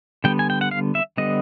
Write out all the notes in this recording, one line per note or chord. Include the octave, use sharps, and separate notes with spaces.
D3 G3 B3 G5
G#5
G5
F#5
F5
E5
D3 G3 B3 D#5